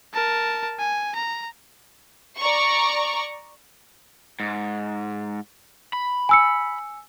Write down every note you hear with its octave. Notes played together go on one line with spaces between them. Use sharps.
A#4 A5
G#5
A#5
D5 A#5 C#6
G#2
B5
G#5 E6 C#7